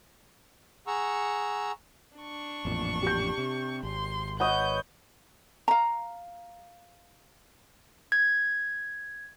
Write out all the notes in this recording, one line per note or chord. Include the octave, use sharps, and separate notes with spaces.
G#4 F#5 A#5 C#6 E6
D4 C#6
A1 F2 A#2
G4 G6
C3
G#1 C6
B4 C#5 D#5 F#5 G6
F5 A#5
G#6